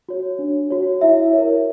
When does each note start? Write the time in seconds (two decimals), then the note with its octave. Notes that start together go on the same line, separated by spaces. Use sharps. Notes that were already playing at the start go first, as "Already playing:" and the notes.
0.09 F#4 C#5
0.39 D4
0.71 F#4 C#5
1.01 E4 E5
1.33 C#5
1.38 A#4